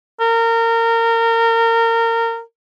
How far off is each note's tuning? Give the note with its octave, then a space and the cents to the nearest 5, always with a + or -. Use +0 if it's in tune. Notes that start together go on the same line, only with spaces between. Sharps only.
A#4 -25